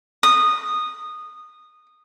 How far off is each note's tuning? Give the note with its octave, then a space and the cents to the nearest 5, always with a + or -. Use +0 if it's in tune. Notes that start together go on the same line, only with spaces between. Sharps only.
D#6 -15